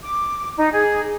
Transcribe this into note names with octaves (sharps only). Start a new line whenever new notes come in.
D6
D#4
G#4